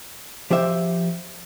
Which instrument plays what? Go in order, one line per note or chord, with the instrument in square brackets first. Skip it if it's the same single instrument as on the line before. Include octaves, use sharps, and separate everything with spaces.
[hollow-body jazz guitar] F3 G4 C5 E5